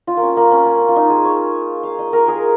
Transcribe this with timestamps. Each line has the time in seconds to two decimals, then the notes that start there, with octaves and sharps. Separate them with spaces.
0.07 F4
0.17 A#3
0.22 C#4
0.37 A#3
0.52 C#4
0.66 A#3
0.81 C#4
0.88 F4
0.96 D#4
1.10 G#4
1.25 C#5
1.83 F5
1.98 D#5
2.13 A#4
2.28 G#4